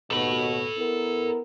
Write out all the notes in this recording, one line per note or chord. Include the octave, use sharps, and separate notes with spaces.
D#2 B2 A4 B5
B3 E4 A#4